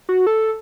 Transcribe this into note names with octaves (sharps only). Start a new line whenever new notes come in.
F#4
A4